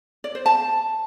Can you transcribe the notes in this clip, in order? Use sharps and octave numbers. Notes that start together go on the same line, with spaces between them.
D5
C5
A5